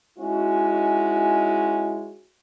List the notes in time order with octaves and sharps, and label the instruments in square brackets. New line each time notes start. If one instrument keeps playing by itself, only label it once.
[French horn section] G#3 C#4 D#4 E4 F#4